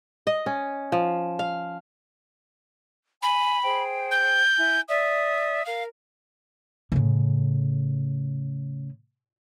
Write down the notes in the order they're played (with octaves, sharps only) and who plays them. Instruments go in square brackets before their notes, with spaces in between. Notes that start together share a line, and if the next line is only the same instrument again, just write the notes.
[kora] D#5
C#4
F3
F5
[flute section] G#5 [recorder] B5
[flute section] G#4 C5 G5
[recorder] G6
[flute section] E4 G#5
[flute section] D5 D#6 [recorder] E5
[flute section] A#4 [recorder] F5
[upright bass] A2 C#3